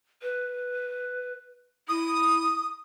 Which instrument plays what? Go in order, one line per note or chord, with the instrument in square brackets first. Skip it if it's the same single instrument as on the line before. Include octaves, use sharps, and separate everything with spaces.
[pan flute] B4
[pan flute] E4 [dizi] D#6